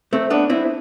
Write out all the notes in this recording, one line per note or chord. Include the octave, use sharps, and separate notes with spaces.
A3 C4
B3 D4
C4 E4